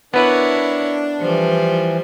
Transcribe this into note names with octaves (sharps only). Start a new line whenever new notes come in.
B3 D4 E4 A#4 B4 C#5 D5
E3 F3 G3 C5